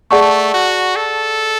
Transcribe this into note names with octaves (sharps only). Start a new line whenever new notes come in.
A3 G#4 D5 F#5 A5 C#6
F#4
A4